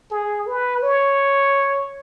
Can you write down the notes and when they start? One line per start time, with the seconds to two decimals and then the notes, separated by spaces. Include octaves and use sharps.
0.11 G#4
0.47 B4
0.82 C#5